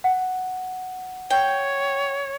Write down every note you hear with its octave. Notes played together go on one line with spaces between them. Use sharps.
F#5
C#5 G5